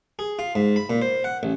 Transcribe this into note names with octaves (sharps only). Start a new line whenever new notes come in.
G#4
F4
G#2
B5
A#2
C5
F#5
A1